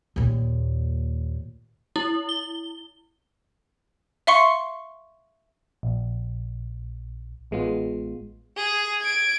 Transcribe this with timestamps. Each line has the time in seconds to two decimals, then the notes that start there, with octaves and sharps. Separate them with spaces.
0.16 D#2 A#2
1.96 E4
2.29 G7
4.27 E5 F5 C6 C#6 C#7
5.83 A#1
7.51 A1 G#3 B3 F4
8.57 G#4
9.01 G#6 D7